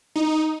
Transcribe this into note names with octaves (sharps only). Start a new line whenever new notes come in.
D#4